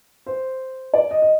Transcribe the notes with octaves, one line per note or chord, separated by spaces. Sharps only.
C5
D5
D#5
D#5